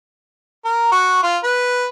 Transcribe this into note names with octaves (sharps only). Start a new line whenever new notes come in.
A#4
F#4
F4
B4